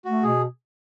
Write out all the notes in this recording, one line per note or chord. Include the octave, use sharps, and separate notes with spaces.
A3 F#4
B2 G#4